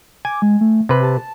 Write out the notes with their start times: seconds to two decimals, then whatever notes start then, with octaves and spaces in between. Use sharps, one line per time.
0.25 G#5 D6
0.42 G#3
0.61 A3
0.89 C3 G4 B4
1.03 A5